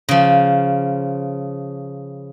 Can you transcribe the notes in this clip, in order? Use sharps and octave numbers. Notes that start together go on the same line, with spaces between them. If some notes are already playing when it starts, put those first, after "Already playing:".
C#3 F3